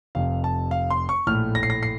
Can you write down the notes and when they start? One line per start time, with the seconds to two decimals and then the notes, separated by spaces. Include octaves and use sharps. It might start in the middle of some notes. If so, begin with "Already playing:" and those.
0.15 F1 F2 C3 F5
0.44 A5
0.71 F5
0.90 C6
1.09 C#6
1.27 A#1 A2 A3 F6
1.55 A#6
1.63 C7
1.70 A#6
1.83 C7